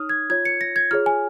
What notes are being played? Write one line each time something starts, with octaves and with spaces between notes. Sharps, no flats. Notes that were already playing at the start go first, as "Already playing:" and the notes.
Already playing: D#4 C#5 D#6 F6
G#6
F4 C#5 G#6
C#7
A#6
G#6
F4 G#4 C#5 F6
G#5